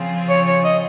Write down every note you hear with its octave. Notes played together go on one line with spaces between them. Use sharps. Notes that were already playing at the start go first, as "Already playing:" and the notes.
Already playing: C#3 F3 C4 F4 G#4
C#5
C#5
D#5